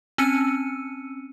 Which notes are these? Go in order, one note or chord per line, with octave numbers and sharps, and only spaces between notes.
C4 C#4 E6 C#7 D#7